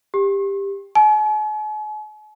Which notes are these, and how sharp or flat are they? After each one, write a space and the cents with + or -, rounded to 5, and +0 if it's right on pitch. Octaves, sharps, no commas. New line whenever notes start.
G4 +15
G#5 +45